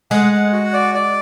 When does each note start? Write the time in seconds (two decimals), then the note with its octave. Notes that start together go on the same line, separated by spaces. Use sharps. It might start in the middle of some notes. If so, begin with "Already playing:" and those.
0.11 G#3 F#5
0.32 F#5
0.53 F#4
0.73 D5
0.94 D5